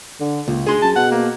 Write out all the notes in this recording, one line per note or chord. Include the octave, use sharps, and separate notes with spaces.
D3
C#2 A#2
D2 G#4 C6
F#2 A5
B2 F#5
A#3